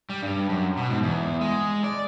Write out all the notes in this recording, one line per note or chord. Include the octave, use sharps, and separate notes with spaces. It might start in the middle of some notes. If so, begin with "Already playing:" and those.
G3
G2
F#2
B2
G#2
E2
G#3
D5